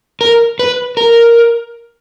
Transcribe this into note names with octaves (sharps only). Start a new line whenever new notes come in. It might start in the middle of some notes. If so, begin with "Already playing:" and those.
A#4
B4
A#4